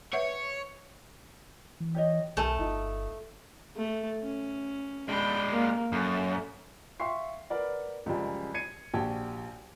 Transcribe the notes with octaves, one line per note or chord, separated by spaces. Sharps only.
B4 C#5 E5 F#5
E3
G4 C#5 D#5
B1 A3 A#4 G#5 A5
G1 D#4 F4
A3
C#4
G#3 D4 G5 B5
A#3
F#2 A4
E5 F5 G5 C6 C#6 C7
A#4 B4 D5 F#5
C#2 F#2 F3 G3 G#3
G#6 C7 C#7 D#7
A#1 F#4 G4 G5 A5 G#6